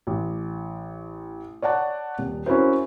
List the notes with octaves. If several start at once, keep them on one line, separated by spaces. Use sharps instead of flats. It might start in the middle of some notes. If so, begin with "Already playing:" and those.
A1
C#5 D5 F#5 A5
D#1
C#4 E4 F#4 A#4 C5